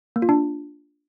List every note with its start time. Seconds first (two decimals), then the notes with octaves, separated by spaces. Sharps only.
0.16 A#3
0.22 F4
0.29 D4